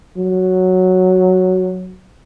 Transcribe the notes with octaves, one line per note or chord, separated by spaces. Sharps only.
F#3